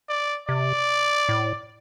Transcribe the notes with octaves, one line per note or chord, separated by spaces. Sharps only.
D5
C3 D5
A2